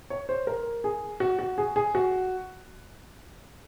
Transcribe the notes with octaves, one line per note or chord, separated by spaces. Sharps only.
C#5
C5
A#4
G#4
F#4
F#4
G#4
G#4
F#4